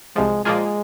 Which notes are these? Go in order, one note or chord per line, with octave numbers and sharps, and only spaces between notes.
C2 C3 F3 G#3
A#2 F3 G#3 A#3 F4 G#4